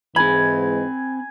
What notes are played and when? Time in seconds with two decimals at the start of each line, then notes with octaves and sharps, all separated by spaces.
0.16 G#2 E3 G#3 C4 G#5 B5